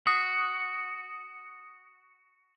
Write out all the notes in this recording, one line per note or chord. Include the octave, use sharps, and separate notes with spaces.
F#4 D#6